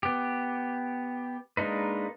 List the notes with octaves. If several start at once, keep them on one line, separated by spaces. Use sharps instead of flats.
B3 G4
G#3 A#3 D4 D#4 B4